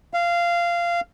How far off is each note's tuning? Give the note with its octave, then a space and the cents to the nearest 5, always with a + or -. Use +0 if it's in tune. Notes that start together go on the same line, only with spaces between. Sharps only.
F5 -15